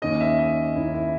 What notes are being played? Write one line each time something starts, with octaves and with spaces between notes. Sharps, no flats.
D#2 D#3 A#3 C#4 D#5
E5
D#5
D#2 D#3 A#3 C#4 E4
E4